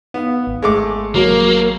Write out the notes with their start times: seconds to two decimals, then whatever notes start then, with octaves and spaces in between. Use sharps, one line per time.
0.14 B3 D#4 F5
0.47 G#1
0.62 G#3 A3 D6
1.15 F#3 A#3